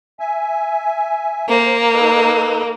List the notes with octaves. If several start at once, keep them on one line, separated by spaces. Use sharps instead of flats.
E5 G#5
A#3 C5
D#4 A4 B4